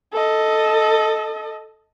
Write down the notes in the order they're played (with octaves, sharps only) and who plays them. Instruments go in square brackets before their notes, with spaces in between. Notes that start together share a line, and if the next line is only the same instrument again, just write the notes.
[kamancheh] A4 D#5